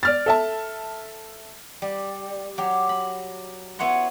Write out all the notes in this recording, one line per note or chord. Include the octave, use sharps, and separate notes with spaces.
D5 F6 A6
A4 E5 A5
G3
F#3 G4
B5
B3 E4 C#5 F#5 C6